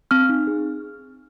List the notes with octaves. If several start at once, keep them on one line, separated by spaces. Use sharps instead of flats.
C4 F6
D#4
G#4